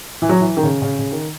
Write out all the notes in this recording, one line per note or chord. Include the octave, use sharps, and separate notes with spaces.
E3
F#3
E3
D#3
C#3
C#3
C#3
D#3